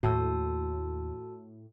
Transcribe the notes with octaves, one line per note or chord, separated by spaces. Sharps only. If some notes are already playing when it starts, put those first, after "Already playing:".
D#2 A2 F#4 A5 E6